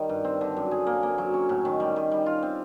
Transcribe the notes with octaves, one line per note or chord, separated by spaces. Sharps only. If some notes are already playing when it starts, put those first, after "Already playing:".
Already playing: D#3 G3
G2
C4
D3
F#2
G#4
A#3
A#3
F#3
C#4
A2
D#3
G3
D#3
G3
F4
C4